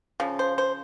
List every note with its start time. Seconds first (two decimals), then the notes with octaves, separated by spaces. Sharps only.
0.20 C#3 F3
0.39 C5
0.58 C5